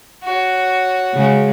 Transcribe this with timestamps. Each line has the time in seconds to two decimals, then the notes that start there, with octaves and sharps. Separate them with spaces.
0.23 F#4 C#5
1.14 C#3 G#3